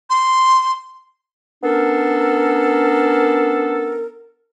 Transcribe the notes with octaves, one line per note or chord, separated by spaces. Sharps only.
C6
B3 C#4 D4 A4 A#4